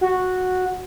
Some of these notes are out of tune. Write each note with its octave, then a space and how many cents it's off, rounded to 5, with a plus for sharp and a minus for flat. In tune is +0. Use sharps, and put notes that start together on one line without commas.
F#4 -5